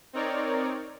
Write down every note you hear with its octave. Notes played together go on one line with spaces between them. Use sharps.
C4 D#4 A#4 C#5 D5